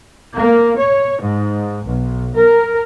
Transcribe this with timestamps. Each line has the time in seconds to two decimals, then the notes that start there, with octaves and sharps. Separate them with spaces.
0.36 A#3
0.77 C#5
1.21 G#2
1.84 B1
2.34 A#4